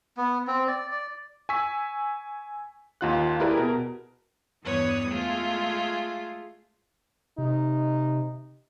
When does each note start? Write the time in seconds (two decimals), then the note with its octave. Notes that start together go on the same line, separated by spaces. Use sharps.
0.17 B3
0.47 C4
0.68 D5
0.92 D5
1.49 G#5 C#6 E6 B6
3.01 D#2 D#4 F4 F#5 F#6
3.40 E4 G4 G#4 A#4 B4 D5
3.57 B2 A#4
4.63 E2 G2 G3 B4 C#5 D#6
5.09 G#3 A3 F4 G#4
7.38 C3 D#4